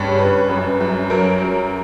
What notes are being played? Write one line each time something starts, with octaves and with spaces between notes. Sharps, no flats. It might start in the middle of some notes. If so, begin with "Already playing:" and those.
Already playing: G2 C#3 C#5
G2 B4
F#2
F#2
F#3 A#4
F#3